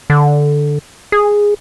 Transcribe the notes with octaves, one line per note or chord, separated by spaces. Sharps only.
D3
G#4